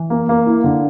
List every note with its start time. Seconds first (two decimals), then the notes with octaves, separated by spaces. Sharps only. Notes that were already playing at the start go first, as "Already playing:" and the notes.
Already playing: E3
0.10 A#3
0.29 A#3
0.47 E4
0.64 D3